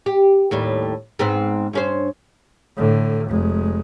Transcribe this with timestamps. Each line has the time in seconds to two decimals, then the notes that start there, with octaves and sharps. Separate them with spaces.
0.06 G4
0.51 D#2 A2 G3
1.19 G#2 B3 C4
1.73 G2 C#4 C5
2.77 A2 D3
3.28 F1 G#3